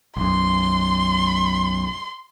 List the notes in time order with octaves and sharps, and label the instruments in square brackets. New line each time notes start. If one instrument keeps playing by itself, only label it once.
[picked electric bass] B1 F#2 [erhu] C6